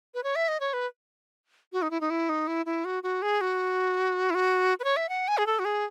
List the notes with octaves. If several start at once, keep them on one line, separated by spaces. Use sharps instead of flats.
B4
C#5
E5
D#5
C#5
B4
F#4
D#4
E4
D#4
E4
D#4
E4
E4
F#4
F#4
G#4
F#4
E4
F#4
B4
C#5
E5
F#5
G#5
G#4
A4
F#4
G#4